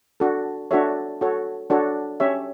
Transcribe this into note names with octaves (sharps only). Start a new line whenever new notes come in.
D4 F#4 A4
D4 F#4 A4 C#5 E5
F#4 A4 C#5
D4 F#4 A4 C#5
C#4 G4 C#5 E5